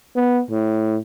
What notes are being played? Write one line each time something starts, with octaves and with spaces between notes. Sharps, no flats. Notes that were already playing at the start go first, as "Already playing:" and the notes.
B3
A2